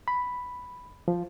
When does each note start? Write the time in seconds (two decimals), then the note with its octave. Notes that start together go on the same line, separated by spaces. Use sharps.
0.08 B5
1.08 F3